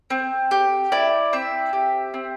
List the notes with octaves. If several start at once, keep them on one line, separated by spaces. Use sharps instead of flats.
C4
G4
E4 D5
C4 E5
G4
C4